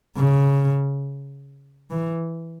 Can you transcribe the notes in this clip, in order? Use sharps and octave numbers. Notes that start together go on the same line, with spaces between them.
C#3
E3